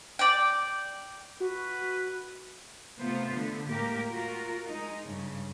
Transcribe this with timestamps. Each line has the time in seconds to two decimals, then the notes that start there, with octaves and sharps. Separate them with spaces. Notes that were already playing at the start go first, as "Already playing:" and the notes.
0.19 D5 G5
1.40 F#4 B4
3.00 C3 A3 B3 F4 C5
3.33 D3 A3 B3
3.70 A2 G#3 A#3 G4 A#4
4.09 F4 F#4 A#4
4.69 G#3 D#4
5.04 G2 C#3